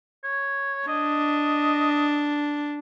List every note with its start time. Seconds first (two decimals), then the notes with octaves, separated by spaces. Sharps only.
0.24 C#5
0.88 D4 D#5